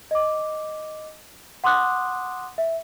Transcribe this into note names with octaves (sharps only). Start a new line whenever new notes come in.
D#5 D6
F#5 C6 D6 D#6 F#6
E5